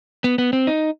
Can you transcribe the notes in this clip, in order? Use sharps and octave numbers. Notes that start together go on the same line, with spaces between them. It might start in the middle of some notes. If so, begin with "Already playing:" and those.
B3
B3
C4
D#4